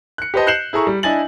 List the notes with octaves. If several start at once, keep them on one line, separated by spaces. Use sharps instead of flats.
F#6 C#7
G4 B4 C5 D#5 A5
F#6 G6 C7 C#7 E7 F#7
E4 G#4 A4 A#5 C#6
G3
D4 E4 D#5 G#5 A6 F#7